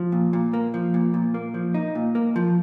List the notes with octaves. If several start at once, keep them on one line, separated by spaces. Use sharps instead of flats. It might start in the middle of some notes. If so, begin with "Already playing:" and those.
Already playing: F3
A#2
A#2
A#3
F3
A#2
A#2
A#3
F3
D#4
A#2
A#3
F3